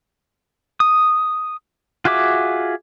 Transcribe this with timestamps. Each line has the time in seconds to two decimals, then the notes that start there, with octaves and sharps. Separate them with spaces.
0.80 D#6
2.05 F4 F#4 G#4 E5 D6